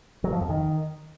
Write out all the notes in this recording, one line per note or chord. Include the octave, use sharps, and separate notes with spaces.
F#3
F3
F2
D#3